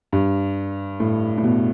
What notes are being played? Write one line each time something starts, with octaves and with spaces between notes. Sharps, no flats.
G2
A2
A2
B2